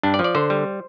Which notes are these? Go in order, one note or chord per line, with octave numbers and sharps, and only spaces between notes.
G2 D4
D5
F3
D5
D3 C5
G3